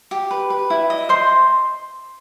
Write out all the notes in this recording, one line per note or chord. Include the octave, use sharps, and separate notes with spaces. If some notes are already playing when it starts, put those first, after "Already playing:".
G4
B4
B4
E4
D#5
C5 C6